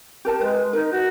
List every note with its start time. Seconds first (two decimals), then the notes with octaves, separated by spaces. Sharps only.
0.25 G4 A#4 A5
0.41 G#3 B4
0.73 D#4 A#4
0.92 F#4